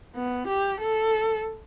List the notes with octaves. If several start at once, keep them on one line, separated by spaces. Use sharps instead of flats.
B3
G4
A4